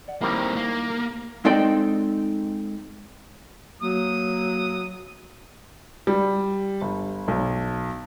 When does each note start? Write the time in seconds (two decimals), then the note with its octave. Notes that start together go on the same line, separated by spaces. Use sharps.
0.08 D5 F#5
0.21 D#3 G3 A#3 C4 E4
0.56 A#3
1.45 G#3 C4 D#4 A4 D5 G5
3.82 F#3 A#3 D#6
6.07 G3
6.82 G1
7.28 B1